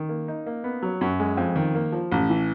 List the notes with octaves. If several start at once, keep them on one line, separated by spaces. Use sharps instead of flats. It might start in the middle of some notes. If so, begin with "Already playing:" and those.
Already playing: D#3
A#3
D#4
A#3
B3
F#3
F#2
G#3
F2
D#3
A#3
F3
A1
E3